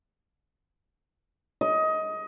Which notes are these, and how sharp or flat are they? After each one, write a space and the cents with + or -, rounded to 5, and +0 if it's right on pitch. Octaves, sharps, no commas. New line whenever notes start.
D#5 +20